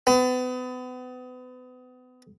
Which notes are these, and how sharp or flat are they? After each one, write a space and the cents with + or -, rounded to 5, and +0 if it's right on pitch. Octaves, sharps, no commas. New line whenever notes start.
B3 +35